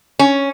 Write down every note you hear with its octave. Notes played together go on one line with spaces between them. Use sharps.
C#4